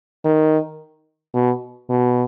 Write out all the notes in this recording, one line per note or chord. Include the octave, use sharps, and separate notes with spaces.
D#3
B2
B2